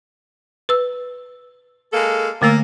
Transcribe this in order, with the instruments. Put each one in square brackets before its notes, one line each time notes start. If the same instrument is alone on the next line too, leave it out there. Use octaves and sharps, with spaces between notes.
[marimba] B4 E6
[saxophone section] G#3 A#3 A4
[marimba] D3 A3 E6 [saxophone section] A#3